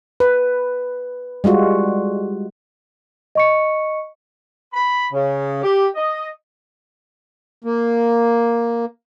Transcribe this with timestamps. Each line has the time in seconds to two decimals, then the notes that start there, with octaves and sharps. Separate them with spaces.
0.20 B4
1.44 G3 G#3 F4 F#4
3.35 D#5 C#6 C#7
4.74 B5
5.12 C#3
5.63 G4
5.95 D#5
7.64 A#3